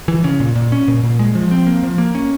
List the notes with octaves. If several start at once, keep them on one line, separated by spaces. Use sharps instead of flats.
E3
C#3
A#2
A#2
C#4
A#2
A#2
G#3
F3
C4
A#3
F3
A#3
C#4